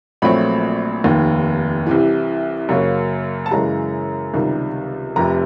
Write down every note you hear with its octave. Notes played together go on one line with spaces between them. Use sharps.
A#1 A#2 F#3 A3 C4 B5
F1 D#2 D#3
C2 C3 E3
F#2 C#3 F#3 A#3
A5
F#2 C#3 E3 G#3 A#5
C#2 C3 D#3 G3
F1 F2 C3 A#5